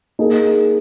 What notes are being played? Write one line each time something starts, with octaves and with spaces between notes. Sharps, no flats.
A#3 D#4 G#4